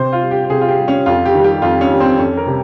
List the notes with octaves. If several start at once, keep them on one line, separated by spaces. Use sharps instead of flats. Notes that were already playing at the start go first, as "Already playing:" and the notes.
Already playing: C3 C5
F4
G3
G4
G4
C3 G#4
F4
G4
G3
C#4
F2 F4
G4
D#3 G3
G4
F2 F4
C#4
D#3 G3
C4
F2 C#4
A#4
C3 G3